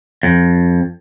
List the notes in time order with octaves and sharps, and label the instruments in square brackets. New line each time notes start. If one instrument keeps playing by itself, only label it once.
[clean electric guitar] F2